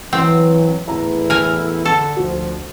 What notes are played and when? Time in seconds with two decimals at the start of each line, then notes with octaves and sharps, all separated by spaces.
0.13 E3 F#3 C4
0.88 E2 A2 E4 A#5
1.30 A#4 G#5
1.85 D3 A4
2.17 D2 F3 F#4